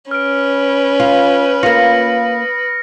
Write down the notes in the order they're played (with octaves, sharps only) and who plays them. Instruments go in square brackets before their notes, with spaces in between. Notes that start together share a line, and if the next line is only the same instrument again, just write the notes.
[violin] C#4 [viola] B4 [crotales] F6 D7
[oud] F4
[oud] A#3 F4 [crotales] D#6 A#6 C#7